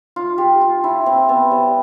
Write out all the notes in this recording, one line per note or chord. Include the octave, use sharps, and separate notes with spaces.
F4
G4
F4
E4
C4
B3
G3